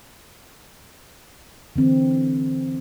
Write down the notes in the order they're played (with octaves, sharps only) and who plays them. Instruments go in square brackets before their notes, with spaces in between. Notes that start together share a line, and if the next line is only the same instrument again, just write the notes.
[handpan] D3 E3 C4